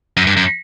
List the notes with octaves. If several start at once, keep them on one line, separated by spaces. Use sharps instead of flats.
F#2
G2
F#2